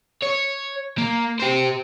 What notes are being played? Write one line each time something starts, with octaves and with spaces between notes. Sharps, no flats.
C#5
A#3
G4 C5